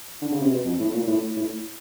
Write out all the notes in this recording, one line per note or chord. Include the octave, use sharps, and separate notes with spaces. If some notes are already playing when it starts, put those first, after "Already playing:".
D3
C#3
C3
B2
F2
A2
A#2
A2
A2